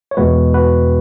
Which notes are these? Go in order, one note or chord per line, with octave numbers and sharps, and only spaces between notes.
C#5
E2 B2 G#3 F#4 B4
F#4 B4